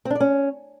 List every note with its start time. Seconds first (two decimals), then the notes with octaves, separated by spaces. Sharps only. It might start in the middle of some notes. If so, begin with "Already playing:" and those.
0.05 C4
0.10 D4
0.15 D5
0.20 C#4